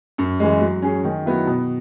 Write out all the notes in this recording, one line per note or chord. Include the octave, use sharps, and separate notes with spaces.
F#2
E3 G#3
F#3
C#4 G#4
D#3
F#3 B3 E4
B2